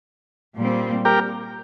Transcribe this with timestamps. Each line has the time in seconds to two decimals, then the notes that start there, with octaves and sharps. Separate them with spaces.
0.57 A#2 G3 C4
1.05 G4 A#4